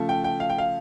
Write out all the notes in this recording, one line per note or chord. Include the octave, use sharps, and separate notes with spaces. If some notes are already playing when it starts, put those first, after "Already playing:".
Already playing: C#3 F3 A3
G5
G5
F5
G5
F5